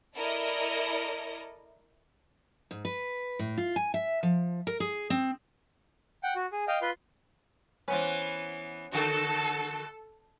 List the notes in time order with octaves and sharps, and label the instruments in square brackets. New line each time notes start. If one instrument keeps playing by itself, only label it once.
[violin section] E4 A4 A#4 D5 D#5
[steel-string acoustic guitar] G#2
B4
A2
F4
G#5
E5
F3
A#4
G#4
C4
[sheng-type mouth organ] F#5 G5
F#4
G#4
D#5 F5 G5
F4 B4 C6
[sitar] E3 B3 B4 [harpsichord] C#4 C5
[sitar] D3 F#4 [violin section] A4